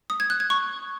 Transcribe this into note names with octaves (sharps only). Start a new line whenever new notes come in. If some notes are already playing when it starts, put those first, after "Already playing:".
D#6
G#6
F#6
G#6
C#6